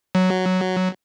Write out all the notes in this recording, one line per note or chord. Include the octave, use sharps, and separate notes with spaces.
F#3